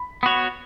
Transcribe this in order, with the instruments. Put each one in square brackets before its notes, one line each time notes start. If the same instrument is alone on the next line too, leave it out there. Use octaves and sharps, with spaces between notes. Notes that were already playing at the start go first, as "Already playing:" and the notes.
Already playing: [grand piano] B5
[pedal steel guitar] B3 F#4 C#5